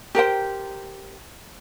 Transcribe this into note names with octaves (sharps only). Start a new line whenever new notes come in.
G4 A#4 C5 G5